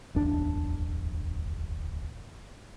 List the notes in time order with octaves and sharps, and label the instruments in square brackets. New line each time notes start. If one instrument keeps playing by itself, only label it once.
[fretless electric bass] D1 G1 E2 D4